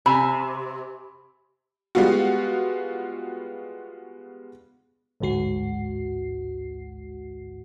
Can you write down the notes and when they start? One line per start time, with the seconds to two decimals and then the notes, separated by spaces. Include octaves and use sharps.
0.06 C3 G#5 B5 E6
1.95 G3 G#3 B3 F4 F#4
5.20 A1 D2 G#2 F#4 C7